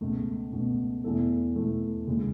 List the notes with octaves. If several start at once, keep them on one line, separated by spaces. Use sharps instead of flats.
C#2 B2 A3
C#2 B2 A3
E2 B2 A3 E4 A4
E2 B2 A3 E4 A4
D#2 C#3 G#3